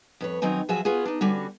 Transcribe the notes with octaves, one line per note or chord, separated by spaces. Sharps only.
F2 B4 C#5
D#3 F#3 C4 D#4 G#5
F3 F#3 F#4 G#4 E5 G#5
B3 F4 F#4 G#4
D4 D#4
D3 G3 C#4 F#4